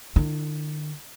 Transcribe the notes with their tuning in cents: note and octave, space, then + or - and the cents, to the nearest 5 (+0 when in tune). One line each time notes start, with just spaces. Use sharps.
D3 +45 E4 +15